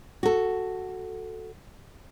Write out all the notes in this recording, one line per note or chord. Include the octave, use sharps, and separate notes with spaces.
F#4 A4